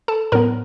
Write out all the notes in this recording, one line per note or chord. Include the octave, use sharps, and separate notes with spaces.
A4 A5
A2 F#3 B3 A#4 A#5